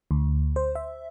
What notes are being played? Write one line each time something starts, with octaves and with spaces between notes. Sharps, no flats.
D2
C5
E5